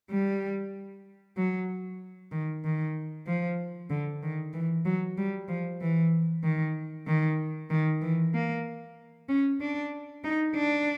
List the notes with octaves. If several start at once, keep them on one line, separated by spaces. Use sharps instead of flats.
G3
F#3
D#3
D#3
F3
D3
D#3
E3
F#3
G3
F3
E3
D#3
D#3
D#3
E3
A#3
C#4
D4
D#4
D4